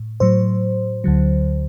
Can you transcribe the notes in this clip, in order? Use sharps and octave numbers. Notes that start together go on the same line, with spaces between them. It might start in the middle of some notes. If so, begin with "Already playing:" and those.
Already playing: A2
A2 F#3 C5
D2 D3 F#3